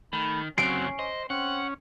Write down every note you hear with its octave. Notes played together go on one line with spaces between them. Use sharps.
D#3 A3 B5
F#2 C#3 F#3 C4 C#4 C7 D7
C5 D#5
C4 C#4 F#5